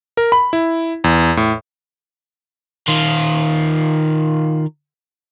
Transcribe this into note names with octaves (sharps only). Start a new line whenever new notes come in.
A#4
B5
E4
E2
A2
D#3 F4